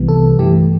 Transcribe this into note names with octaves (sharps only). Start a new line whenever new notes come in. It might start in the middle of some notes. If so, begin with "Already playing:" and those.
Already playing: C2 C3 E3 G3 B3
A4
G2 E3 A3 G4